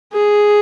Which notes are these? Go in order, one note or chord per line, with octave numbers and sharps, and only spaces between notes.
G#4